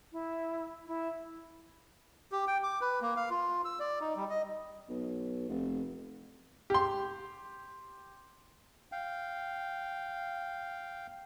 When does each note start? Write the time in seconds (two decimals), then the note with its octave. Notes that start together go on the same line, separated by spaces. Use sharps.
0.12 E4
0.87 E4
2.32 G4
2.48 G5
2.63 D6
2.81 B4
3.01 A#3
3.16 F5
3.30 F4
3.65 E6
3.80 D5
4.01 D#4
4.16 G3
4.30 D#5
4.89 B1
5.49 F1
6.70 G4 C6
8.92 F5 G5